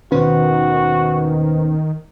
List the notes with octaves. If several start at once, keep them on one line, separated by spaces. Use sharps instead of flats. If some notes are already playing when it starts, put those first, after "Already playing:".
D#2 B2 D#3 C#4 F#4 B4 C5